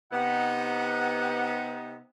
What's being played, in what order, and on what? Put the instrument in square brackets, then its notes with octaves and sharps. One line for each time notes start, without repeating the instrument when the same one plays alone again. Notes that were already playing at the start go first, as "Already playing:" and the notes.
[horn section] C3 B3 D#4 [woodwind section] G4 F#5